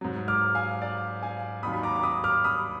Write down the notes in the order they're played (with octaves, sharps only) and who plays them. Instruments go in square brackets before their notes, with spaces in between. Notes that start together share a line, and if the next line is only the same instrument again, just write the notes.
[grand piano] G#2 F#3
D6 F6
F5 G#5
D5 F5
F5 G#5
D#2 D#3 F#3 B5 D#6
B5
A#5 D6
D6
B5 D#6
D6 F6
B5 D#6